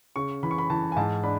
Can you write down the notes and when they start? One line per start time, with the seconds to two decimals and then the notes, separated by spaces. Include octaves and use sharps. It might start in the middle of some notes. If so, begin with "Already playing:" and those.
0.16 C#3 C#6
0.43 E3 B5
0.51 C#6
0.58 B5
0.70 E3 A5
0.92 G#5
0.96 G#2 A5
1.23 D4 B5